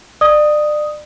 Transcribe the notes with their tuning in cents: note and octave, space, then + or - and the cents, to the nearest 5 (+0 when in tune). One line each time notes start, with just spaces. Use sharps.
D5 +35 D#6 +0